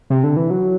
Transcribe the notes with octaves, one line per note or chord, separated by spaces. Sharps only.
C3
D3
E3
F#3